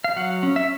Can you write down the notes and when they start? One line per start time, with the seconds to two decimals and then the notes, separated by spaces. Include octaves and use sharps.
0.04 F5
0.16 F#3 F#5
0.43 C#4
0.56 E5